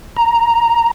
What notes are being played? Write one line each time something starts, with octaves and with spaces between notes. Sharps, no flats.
A#5